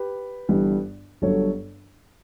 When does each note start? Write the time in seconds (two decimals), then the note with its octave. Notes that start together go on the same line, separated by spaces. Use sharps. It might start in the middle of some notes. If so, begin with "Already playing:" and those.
Already playing: G4 B4
0.49 G1 G2 E3 G3
1.22 G1 G2 F#3 A4 C#5